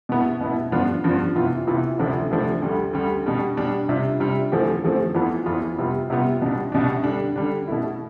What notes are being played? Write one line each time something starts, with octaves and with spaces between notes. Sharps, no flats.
B2 B3 E4
B2 B3 E4
G2 F3 B3 D4 F4
G2 F3 B3 D4 F4
C3 E3 B3 F4
C3 E3 B3 F4
D2 C3 F3 A3 D4
D2 C3 F3 A3 D4
D2 D3 G3
D2 D3 G3
B2 G3 D4
B2 G3 D4
C3 G3 D4 F4
C3 G3 D4 F4
E2 D3 F3 A3 C4
E2 D3 F3 A3 C4
F2 E3 B3 F4
F2 E3 B3 F4
C3 G3 B3 F4
C3 G3 B3 F4
C2 B2 G3 D4
C2 B2 G3 D4
D3 G3 D4
D3 G3 D4
B2 A3 E4